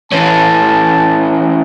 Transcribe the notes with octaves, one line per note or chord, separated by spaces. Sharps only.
E3 C#4 A5